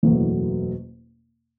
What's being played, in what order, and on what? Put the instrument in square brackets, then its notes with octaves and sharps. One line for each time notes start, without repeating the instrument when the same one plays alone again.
[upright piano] F#1 E2 B2 F#3 A3